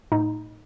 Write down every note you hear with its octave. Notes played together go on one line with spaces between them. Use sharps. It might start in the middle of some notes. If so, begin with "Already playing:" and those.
A2 D#4